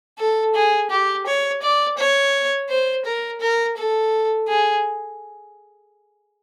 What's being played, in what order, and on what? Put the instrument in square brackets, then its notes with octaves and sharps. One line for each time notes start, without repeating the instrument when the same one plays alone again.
[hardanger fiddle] A4
G#4
G4
C#5
D5
C#5
C5
A#4
A#4
A4
G#4